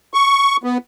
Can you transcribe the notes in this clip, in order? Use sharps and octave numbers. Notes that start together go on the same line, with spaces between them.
C#6
B3